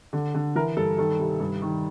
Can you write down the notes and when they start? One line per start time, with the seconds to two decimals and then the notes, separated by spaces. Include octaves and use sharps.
0.13 D3
0.35 D3
0.55 E3 A#4
0.77 G2 A4
0.98 D#3 A4
1.19 C3
1.40 G2
1.62 D#3